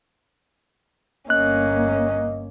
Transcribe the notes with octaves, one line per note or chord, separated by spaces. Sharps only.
G1 A#3 C#4 D#5 F#6